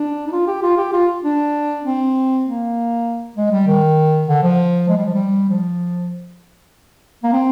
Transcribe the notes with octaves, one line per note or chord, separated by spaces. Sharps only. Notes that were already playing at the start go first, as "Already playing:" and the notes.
Already playing: D4
D#4
F4
G4
F4
G4
F4
D4
C4
A#3
G#3
G3
D#3
D3
F3
G#3
G3
F3
G3
F3
A#3
C4